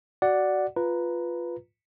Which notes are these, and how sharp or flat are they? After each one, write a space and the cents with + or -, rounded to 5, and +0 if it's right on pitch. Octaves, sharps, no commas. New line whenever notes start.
F#4 +15 D5 +0 F#5 +0
F4 +0 B4 +0 A#5 +0